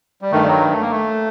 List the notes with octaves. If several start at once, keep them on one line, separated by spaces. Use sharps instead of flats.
G3
G2 D#3 A3
G3
F#3
A3
A#3
A3